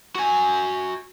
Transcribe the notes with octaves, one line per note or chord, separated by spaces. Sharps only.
F#4 G#5